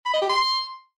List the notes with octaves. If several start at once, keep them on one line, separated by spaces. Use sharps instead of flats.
B5
D#5
G4
C6